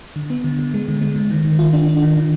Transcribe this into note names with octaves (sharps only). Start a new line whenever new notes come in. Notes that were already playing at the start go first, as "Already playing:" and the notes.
D3
B3
D3
D3
G#3
D3
G#3
D3
D#3
D#3
F4
D4
D4
D#3
D#3